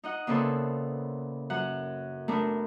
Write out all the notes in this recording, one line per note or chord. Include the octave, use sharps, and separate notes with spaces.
D#4 D#5 F#5
A#2 C#3 B3 C4 E4 A4
F#2 F#5
A3 B3 D4 A#4